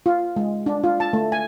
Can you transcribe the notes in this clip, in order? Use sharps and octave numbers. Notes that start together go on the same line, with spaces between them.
F4
G#3
D4
F4
A5
A3
G#5